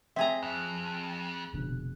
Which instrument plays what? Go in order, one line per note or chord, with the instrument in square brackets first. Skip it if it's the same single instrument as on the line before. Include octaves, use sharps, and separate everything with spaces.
[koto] C4 G#4 A#5 [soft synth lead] E5
[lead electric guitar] F2 [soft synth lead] F#6
[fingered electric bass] F1 B2 D3